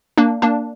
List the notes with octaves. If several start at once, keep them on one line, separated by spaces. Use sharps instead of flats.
A#3 D4
A#3 D4